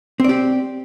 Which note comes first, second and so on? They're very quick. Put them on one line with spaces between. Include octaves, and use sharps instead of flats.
C4 D5 G4